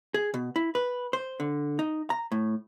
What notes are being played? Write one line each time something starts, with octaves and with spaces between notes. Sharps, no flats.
G#4
B2
E4
B4
C5
D3
D#4
A#5
A2